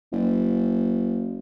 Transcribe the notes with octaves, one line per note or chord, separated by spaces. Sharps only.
F#1